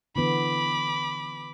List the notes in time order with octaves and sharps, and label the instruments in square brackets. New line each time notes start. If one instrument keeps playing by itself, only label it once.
[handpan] D3 E3 B3 [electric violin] B5 D6